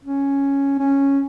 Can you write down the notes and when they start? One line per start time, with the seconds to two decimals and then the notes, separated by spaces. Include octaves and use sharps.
0.04 C#4
0.79 C#4